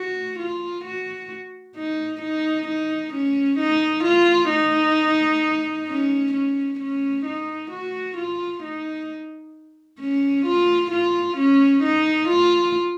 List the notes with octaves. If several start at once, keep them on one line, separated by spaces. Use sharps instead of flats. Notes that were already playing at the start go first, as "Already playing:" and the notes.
Already playing: F#4
F4
F#4
D#4
D#4
D#4
C#4
D#4
F4
D#4
C#4
C#4
C#4
D#4
F#4
F4
D#4
C#4
F4
F4
C#4
D#4
F4